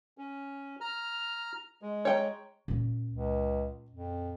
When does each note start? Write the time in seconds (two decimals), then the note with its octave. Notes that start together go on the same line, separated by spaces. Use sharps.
0.18 C#4
0.81 A#5 F6
1.82 G#3
2.05 C#5 G5 A#5
2.68 A#2 C#4
3.10 C#2
3.90 F2